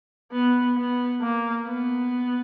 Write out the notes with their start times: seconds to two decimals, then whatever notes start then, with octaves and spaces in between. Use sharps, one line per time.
0.32 B3
0.76 B3
1.21 A#3
1.67 B3